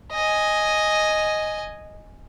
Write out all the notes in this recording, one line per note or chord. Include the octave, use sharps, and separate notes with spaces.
D#5 G#5